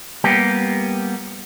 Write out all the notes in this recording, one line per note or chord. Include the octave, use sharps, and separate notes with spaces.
G3 A#3 B3 G4